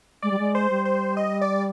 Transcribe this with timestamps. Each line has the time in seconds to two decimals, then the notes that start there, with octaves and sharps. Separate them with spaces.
0.22 G#3 D5
0.31 G3
0.39 G#3
0.55 C5
0.70 G3
0.85 C5
1.17 D#5
1.41 D5